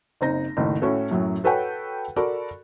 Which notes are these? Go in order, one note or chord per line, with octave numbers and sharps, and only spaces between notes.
F#1 C4 D#4 A#6
F#1 A2 D#3
A2 C#4 E4 F#4 A4
F#2 A2 F#3
F#4 A4 B4 C#5 F#5 G5
F#4 A4 A#4 D5 B5